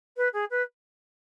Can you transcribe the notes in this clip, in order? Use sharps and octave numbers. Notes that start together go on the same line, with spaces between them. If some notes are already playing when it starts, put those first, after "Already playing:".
B4
G#4
B4